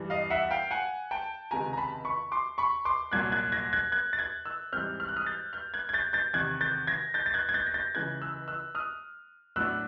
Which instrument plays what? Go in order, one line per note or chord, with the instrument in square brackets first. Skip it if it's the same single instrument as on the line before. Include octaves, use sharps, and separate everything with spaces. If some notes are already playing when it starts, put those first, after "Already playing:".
Already playing: [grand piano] G2 E3 G3
D#5 F5
E5 F#5
F5 G5
F#5 G#5
G5 A5
C#2 C3 D#3 G#3 B3 G#5 A#5
A#5
A5 B5
B5 C#6
C6 D6
B5 C#6
C6 D6
C2 A#2 F#3 A#3 F#6 G#6
F#6 G#6
G#6 A#6
F#6 G#6
F#6 G#6
A6
F#6 G#6
E6 F#6
G#2 E3 G3 C4 F6 G6
F6
F#6
D#6 F6
G6 A6
F6 G6
F#6 G#6
G#6
G6 A6
G6 A6
E2 C3 D#3 F#6 G#6
G6 A6
G#6 A#6
G6 A6
A6
F#6 G#6
G#6
G6 A6
A#6
G6 A6
C#2 C#3 E3 F#6 G#6
E6 F#6
E6 F#6
D#6 F6
A2 F#3 B3 D4 E6 F#6